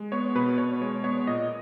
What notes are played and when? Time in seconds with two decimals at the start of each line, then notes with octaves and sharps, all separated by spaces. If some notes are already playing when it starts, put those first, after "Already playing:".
Already playing: G#3
0.12 B3 C#5
0.35 B2 B4
0.58 B2 C#5
0.81 G#3 C#5
1.04 B3 C#5
1.27 A#2 D#5